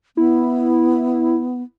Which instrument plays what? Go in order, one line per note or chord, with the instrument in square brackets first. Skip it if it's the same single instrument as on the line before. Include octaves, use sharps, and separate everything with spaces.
[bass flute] B3 [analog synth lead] E4